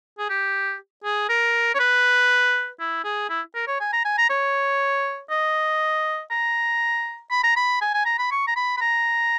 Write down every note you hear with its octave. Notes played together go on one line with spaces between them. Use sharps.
G#4
G4
G#4
A#4
C#5
B4
E4
G#4
E4
A#4
C#5
G#5
A#5
G#5
A#5
C#5
D#5
A#5
B5
A#5
B5
G#5
G#5
A#5
B5
C#6
A#5
B5
B5
A#5